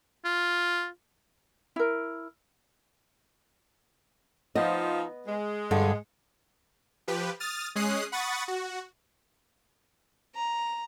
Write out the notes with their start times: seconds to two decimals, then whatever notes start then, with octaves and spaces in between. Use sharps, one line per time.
0.25 F4
1.76 E4 A#4
4.55 F3 B3 D#4 D#5
5.27 G#3
5.71 G2 D3
7.08 F3 G4 B4
7.40 D#6 F6 A6
7.75 G#3 C#4 D#6 F#6 C7
8.12 F#5 B5 C#6 D#6 A6
8.48 F#4
10.36 A#5